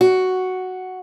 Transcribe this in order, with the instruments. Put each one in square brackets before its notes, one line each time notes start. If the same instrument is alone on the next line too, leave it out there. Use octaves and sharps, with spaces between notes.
[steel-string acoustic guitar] F#4